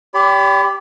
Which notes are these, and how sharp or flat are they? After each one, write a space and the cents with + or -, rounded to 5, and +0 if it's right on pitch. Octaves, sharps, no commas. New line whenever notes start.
G4 +0 D5 -45 B5 +25